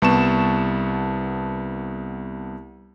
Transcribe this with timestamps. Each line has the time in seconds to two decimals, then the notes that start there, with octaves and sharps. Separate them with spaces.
0.02 C2 B3 A5 C#6 E7